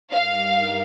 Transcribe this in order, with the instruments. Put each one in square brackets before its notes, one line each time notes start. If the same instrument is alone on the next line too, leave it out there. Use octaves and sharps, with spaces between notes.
[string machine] G2 G3 D#4 G4 A#4 [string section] F5